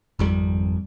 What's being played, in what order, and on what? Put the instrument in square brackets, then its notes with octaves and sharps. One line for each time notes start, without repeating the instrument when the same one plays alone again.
[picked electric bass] G#1 F2 G3